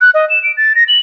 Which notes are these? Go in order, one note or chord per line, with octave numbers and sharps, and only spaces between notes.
F#6
D#5
E7
D7
A6
A#6
F#7